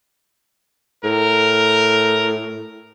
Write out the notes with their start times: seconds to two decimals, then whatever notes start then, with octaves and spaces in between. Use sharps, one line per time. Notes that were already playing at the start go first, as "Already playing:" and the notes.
1.04 A2 A#4